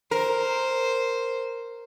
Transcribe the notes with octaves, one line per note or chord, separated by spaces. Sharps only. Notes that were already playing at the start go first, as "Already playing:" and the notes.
A#4 C5